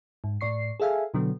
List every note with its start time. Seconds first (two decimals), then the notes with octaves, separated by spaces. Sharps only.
0.24 G#2
0.41 A2 D5 C#6 C7
0.80 G#4 A4 E5 F5 G#5
1.14 B2 D3 F#3 B3